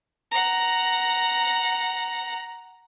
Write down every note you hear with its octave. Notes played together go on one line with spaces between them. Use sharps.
F#5 A#5